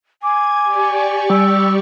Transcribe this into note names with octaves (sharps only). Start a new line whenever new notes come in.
G#5 D6 G#6
G4 D5 C#6
G3 E6